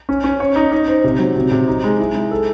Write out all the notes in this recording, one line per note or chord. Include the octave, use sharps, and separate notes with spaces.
C#4
C#4
C#5
D#4
D#4
C5
C3
F#3
C3
C3
D#4
G#3
E4
G#3
A4